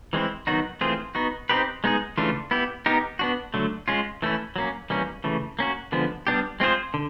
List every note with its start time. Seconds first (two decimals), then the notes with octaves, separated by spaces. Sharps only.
0.13 E3 G#3 C4 E4
0.47 D#3 F#3 B3 D#4 F#4
0.81 E3 A3 C4 F4 G#4
1.15 B3 D#4 F#4
1.49 C4 D#4 G4 B4
1.84 G#3 B3 D#4 G#4
2.18 C#3 E3 A3 D4 F4
2.51 B3 E4 G4
2.86 B3 D#4 G4 A#4
3.19 B3 D4 F#4
3.54 D3 F#3 A3
3.88 G#3 C#4 F4
4.22 E3 A3 C#4 E4
4.56 F#3 A#3 C#4
4.90 E3 G3 A#3 C#4
5.24 C#3 E3 A3
5.59 A#3 C#4 F#4
5.92 D3 F3 G#3 B3
6.27 G3 B3 D4 G4
6.60 G#3 C4 F4 G#4 C5
6.94 D3